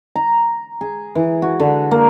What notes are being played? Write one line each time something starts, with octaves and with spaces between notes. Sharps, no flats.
A#5
G#4
E3
F#4
D3
A#3